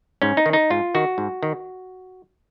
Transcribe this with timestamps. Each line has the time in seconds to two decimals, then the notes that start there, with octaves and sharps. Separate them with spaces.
0.22 G#2 C#4
0.37 D#4
0.46 D#3
0.53 D#4
0.70 G#2 F4
0.95 D#3 F#4
1.18 G#2
1.43 D#3